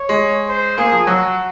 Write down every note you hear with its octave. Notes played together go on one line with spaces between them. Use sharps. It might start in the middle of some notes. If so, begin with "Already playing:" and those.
Already playing: C#5
G#3
C5
A#3 G#4
F3
F#3 F#4